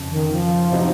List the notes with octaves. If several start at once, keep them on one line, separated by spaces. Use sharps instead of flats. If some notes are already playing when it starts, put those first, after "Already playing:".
Already playing: F2 C#3
D#3
F3
C3 F#3 C4 D#4